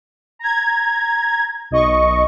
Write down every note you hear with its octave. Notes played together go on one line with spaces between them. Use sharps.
A#5 G#6
B1 D#5 C#6